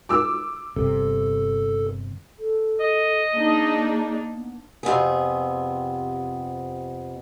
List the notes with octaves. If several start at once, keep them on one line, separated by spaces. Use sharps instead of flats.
D6 E6
G1 C3 A4
A4
D#5
A#3 D4 D#4 G#4
B3
F2 C3 B3 G#4